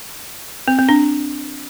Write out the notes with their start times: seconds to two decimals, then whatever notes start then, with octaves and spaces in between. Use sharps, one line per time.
0.68 C4
0.79 C4
0.89 D4